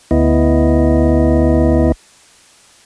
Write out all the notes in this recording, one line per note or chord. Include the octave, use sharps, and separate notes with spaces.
D2 B3 E4 D#5